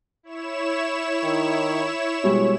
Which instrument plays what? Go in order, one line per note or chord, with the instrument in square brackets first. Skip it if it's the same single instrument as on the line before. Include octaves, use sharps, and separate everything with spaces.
[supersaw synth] E4 C#5 E7
[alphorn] D#3
[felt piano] B2 G3 G#3 [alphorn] C#5